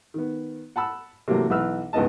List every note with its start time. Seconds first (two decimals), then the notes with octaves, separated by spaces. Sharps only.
0.14 D#3 B3
0.76 F#5 A5 B5 E6
1.28 C3 E3 F#3 A3 A#3
1.50 B1 E3 B4 E6 F6
1.93 C#2 G2 B3 D#4 D#5 A5